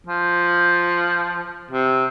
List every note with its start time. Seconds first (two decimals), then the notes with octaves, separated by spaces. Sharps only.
0.07 F3
1.71 C3